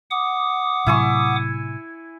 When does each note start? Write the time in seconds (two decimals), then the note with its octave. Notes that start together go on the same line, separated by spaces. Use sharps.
0.11 F#5 D6 D#6
0.87 A2 C3 F#3 E4 G#5 C#6